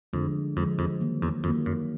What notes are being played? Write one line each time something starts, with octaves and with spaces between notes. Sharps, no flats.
F2 D3 F3 G#3
F2 D3 F3 G#3
F2
D#3 F#3 A#3
E2
F2 D#3 F#3 A#3
F#2